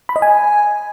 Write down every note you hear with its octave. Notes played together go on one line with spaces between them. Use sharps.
B5
D#5
G#5